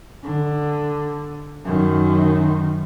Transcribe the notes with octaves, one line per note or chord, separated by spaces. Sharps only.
D3
F#2 D#3